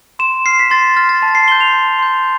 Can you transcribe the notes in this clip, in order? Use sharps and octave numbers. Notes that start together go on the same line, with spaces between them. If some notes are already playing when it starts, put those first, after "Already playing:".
C6 E7
F6 C7
B6
C6 A6
F6 A6
A6
A5
C7
C6 G6 G7
F7
A5
C6 G6